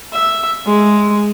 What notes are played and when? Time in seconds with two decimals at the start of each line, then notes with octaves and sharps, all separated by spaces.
0.13 E5
0.66 G#3